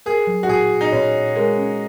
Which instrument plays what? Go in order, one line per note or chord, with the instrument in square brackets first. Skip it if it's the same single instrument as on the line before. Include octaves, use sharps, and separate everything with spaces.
[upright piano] G#4 [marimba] A#4
[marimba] F#3
[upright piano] F#4
[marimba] A#2 [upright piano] G#4
[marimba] A#2
[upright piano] D#4
[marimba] A#2 [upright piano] C#4
[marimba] A#2
[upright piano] G#3 [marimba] A#4
[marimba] C#4